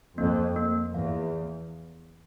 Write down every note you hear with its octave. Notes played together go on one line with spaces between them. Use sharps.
F2 A#3
A#3
E2 F5